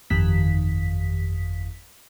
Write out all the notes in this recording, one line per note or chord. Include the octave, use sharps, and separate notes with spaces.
G1 F2 D#3 B6